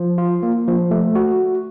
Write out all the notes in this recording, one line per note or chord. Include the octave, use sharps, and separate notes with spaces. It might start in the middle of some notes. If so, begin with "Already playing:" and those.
Already playing: F3
F4
A#3
F3
A3
F#4